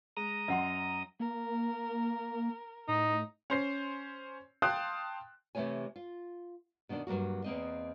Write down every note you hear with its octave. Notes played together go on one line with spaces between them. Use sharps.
G#3 A#5 D#6
F#2 D#5 F#5 C6
A#3 A#4
A2 D#4
C#4 C5 C7
F5 G5 A5 C6 D#6 F#6
C3 E3 A3 A#3 C#5 G#5
F4
B2 D#3 A#3 D4
G2 F#3 A#3 F#4
E2 A#3 C4 D#5